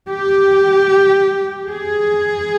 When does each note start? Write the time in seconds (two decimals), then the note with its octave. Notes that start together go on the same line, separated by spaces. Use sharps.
0.09 G4
1.68 G#4